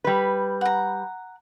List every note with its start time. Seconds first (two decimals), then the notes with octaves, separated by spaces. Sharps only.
0.04 G3 B4
0.61 F#5 A#5